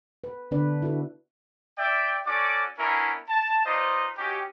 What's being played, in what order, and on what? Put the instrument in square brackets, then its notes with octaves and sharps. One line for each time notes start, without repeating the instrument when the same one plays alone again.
[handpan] B4
D3 B3 D4 B4 D5
E4 F#4 A4 B4
[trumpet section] D5 E5 G5
C#4 F#4 A4 D5 D6
B3 C#4 D4 E4 A#4
A5
D#4 F4 B4 C5 D5 D#5
C#4 D#4 F#4 G4